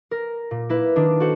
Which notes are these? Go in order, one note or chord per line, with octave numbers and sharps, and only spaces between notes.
A#4
A#2
A#3 E4 B4
D#3 D4
F#4 A4 C5 F#5